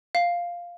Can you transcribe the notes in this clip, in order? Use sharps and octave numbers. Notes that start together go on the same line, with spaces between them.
F5